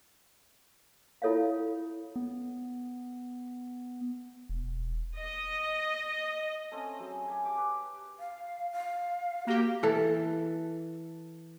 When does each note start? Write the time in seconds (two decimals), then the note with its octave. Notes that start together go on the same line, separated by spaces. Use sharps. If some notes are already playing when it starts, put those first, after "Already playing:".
1.22 E4 F4 A4 C#5 E5 F5
2.16 B3
4.49 E1
5.17 D#5
6.71 A3 C4 C#4 A4
7.00 F#3 A3 G#4
7.26 G4 G#5 A5
7.45 G4 D6
7.58 B4
8.19 F5
8.72 F5
9.47 A#3 F#4 G4
9.83 E3 A4